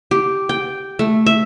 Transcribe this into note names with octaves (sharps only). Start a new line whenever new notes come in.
G4
G5
A3
E5